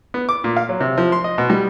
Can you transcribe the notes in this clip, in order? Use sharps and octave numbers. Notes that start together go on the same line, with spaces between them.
B3
D6
A#2
F5
F#3
C3
F3
C6
D#5
B2
G3